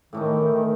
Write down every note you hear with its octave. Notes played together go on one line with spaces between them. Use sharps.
A2 D#3 E3 A3 D#4
D#3